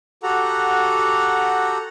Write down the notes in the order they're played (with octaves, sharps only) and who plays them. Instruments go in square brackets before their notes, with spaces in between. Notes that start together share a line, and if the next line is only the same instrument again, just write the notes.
[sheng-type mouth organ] F#4 G4 A4 F#5 A#5